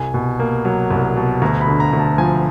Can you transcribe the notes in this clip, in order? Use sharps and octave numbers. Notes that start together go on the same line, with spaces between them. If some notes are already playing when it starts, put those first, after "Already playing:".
Already playing: C2 G#5
B2
A#3
F#3
C2
B2
D2 A#5
B5
D3
A#5
D2
A5
F3 G#5